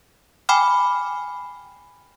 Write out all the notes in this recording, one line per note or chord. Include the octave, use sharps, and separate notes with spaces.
G5 G#5 B5 D6 F6